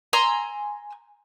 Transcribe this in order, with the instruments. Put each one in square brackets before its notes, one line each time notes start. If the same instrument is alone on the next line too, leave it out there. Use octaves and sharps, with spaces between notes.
[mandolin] G#5 A#5 C6 E6